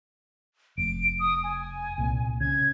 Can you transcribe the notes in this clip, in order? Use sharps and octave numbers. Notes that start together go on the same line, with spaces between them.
F1 D7
D#6
G#5
C2 A#2
C#3 G#6